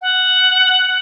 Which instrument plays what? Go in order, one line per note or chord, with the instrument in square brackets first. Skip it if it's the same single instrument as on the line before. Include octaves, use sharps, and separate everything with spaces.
[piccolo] F#5